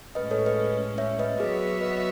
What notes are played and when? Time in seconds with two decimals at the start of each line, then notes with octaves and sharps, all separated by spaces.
0.15 A2 G#3 C#4 B4 D#5
0.31 A4 C#5
0.46 B4 D#5
0.98 C#5 E5
1.19 B4 D#5
1.40 F#3 B3 F#4 G#4 B4 C#5 E5
1.81 B4 D#5